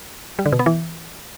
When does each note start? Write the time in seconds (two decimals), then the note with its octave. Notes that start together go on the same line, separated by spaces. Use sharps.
0.39 G3
0.46 D3
0.52 B2
0.59 B3
0.66 E3